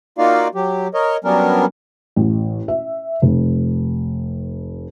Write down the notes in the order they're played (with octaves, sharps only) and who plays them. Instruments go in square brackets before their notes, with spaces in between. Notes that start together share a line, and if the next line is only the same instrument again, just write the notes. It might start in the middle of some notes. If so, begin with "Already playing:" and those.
[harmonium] A#3 D#4 F4 F#4 D5 F5
F#3 G4
A#4 C#5 D#5
F#3 G3 B3 C#4 D4 A#4
[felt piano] A1
E5
F1